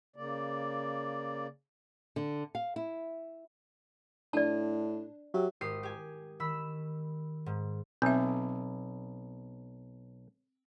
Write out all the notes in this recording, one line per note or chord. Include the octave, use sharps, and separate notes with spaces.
C#3 A#3 D5
D3
F5
E4
A2 D4 D5 A5
F#3 G4 E5
G#1 G4 D#6 C7
G4 G#5
D#3 B5 E6 B6
G#2
B1 C4 E5